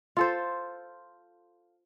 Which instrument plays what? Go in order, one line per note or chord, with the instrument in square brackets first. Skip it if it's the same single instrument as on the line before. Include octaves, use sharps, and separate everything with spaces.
[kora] F4 A4 C5